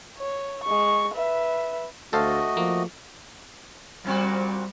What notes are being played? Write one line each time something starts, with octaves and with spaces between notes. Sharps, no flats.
C#5
G#3 C#6
B4 E5
D2 A3 F#4 A4 C5 D#5 F5
F3 A#3
A#2 G3 C4 F#4